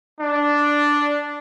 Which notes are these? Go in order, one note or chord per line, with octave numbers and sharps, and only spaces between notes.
D4